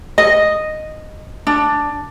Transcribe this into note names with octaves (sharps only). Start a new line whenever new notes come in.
D#5
D4